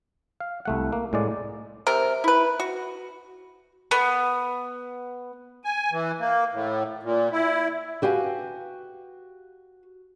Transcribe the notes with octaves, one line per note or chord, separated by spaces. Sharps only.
F5
C2 A3 F#5
A#3
A2 G#3 D5
C3 A#4
E4 B4
F#4
B3
G#5
E3
A#3
A2
A#2
E4
F#4 G4 B4 F5 G#5